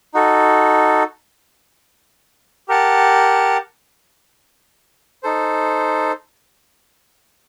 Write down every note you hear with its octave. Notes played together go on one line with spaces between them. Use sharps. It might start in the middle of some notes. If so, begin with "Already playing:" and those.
D#4 F#4 A4
G4 A#4 F#5 A5
D#4 A4 C5